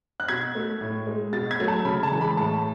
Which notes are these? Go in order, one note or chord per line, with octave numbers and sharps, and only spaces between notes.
F#6
B2 G#6
A3
A2
G#3
B2 A6
G#6
F#3 A3
A5
C#3 B5
A5
E3 G#3
B5
A2 A5